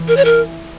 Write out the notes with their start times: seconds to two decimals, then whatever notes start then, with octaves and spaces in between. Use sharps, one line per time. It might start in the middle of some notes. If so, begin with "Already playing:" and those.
Already playing: E3
0.08 A#4
0.17 C#5
0.25 A#4